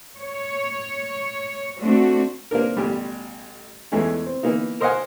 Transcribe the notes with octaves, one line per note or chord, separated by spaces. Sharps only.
C#5
A3 C4 D4 F#4
A#3 C4 D4 A#4
A1 B2 G3
E2 E3 G#3 A3 C#4
C4
E3 A#3 B3 D#4
A#4 C5 D#5 F5 F#5 G#5